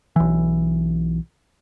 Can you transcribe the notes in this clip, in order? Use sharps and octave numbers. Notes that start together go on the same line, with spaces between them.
B1 E3